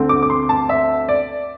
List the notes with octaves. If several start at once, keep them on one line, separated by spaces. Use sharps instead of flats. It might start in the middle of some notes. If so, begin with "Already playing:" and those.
Already playing: D2 D3 A3 C4
D6
D6
C6
A5
E5
D5